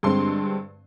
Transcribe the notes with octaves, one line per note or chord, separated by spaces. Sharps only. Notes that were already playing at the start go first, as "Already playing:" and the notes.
G2 D3 G#3 C4 C6